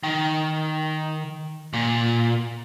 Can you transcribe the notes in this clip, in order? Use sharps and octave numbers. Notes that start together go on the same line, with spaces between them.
D#3
A#2